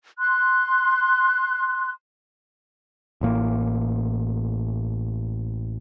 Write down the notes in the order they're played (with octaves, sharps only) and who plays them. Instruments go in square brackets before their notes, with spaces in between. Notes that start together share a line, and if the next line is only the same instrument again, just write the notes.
[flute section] C6 F#6
[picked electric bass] A1 A2 A#3